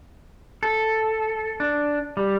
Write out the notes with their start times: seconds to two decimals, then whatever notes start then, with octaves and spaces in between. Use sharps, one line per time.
0.63 A4
1.60 D4
2.17 G3